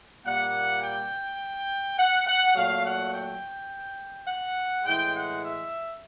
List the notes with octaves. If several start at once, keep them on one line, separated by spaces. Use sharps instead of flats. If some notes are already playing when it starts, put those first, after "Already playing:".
A#2 G3 A#3 F#5
G5
F#5
F#5
A#2 F#3 A3 F5
F#5
G5
F#5
A2 E3 G#3 G5
F#5
E5